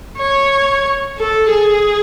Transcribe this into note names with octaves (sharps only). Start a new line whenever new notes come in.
C#5
A4
G#4